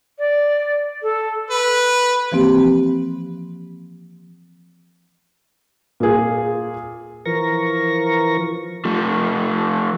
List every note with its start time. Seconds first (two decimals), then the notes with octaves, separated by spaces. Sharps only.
0.18 D5
1.02 A4
1.51 B4
2.32 E3 F3 A#3 C4 G4
6.00 A#2 G#4
7.26 E3 F3 A#4 C#6 A#6
8.85 F3 A3